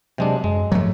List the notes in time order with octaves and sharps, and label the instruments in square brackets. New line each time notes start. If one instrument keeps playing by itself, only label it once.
[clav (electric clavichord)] C3 G#3 D4 [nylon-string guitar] F#3 C4 C5
[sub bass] F#2 [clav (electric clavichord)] G#3
[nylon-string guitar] D#2 F3 C5 [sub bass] G#2 [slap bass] F#3 A3